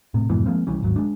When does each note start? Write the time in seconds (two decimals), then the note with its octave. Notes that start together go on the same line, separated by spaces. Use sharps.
0.14 A2 C3
0.30 F2 G#2 B2 E3
0.46 F3 G#3 A#3 C4
0.67 C2 E3 G3 C#4
0.83 G#1 D#2 F#3
0.96 G#3 D4